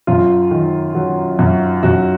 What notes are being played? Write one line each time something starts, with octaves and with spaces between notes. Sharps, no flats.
F#2 F4
D#3
F#3
F#2
F#2 F#4